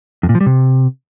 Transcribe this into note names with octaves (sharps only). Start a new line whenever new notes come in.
F2
A#2
F3
G3
C3